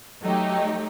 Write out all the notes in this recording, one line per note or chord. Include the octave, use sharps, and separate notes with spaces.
F#3 A3 D#4 G4